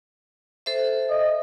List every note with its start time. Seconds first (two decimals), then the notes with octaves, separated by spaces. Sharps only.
0.66 A4 C5 E5
1.10 D#5